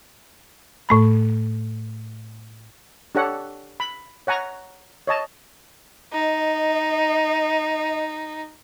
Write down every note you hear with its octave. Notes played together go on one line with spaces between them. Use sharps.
A2 A3 B5
D4 G4 A4 C#5 F#5
B5
C#5 F#5 G#5 A#5
C#5 D#5 A5
D#4 D#5